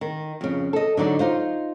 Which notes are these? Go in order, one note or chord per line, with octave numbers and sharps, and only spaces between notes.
D#3
F2 C#3
A4 D#5
D3 F#3 D#4 D5
D#4 F4 C5